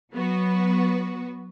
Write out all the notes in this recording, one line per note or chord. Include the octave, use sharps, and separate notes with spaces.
F#3 B3 F#4 B4